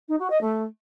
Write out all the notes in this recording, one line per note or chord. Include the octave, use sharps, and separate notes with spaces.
D#4
F#4
D#5
A3